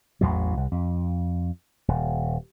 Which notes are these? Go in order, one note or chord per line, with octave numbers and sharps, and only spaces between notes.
A1 E2 A2 F#3
C2
F2
D#1